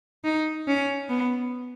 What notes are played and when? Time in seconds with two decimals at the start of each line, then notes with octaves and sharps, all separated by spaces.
0.24 D#4
0.68 C#4
1.09 B3